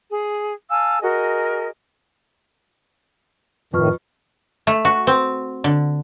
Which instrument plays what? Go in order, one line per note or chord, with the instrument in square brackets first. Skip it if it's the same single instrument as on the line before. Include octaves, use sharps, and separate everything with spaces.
[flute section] G#4
F5 G#5 A5 E6
F#4 G#4 A#4 D#5
[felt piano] F2 [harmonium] A2 D#3 [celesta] B4 C#6 F6
[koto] A3
F#4
C4
D3